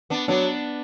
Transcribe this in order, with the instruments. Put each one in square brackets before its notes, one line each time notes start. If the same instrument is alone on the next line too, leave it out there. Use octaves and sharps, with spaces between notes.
[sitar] B3 D4
[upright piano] F#3 [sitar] B3 D4